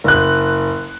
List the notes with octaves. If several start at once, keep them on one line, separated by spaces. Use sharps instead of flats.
F#1 F#6